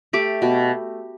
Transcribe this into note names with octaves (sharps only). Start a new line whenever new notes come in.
A3 G4
B2